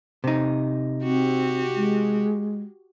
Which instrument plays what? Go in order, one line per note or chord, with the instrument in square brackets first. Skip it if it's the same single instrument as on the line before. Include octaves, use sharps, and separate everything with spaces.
[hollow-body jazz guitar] C3 D#4
[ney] C4 [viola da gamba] F#4 G4
[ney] G#3